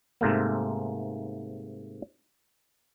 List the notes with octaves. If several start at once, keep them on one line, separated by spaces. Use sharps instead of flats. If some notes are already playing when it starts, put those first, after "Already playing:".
G#2 C3 A3 A#3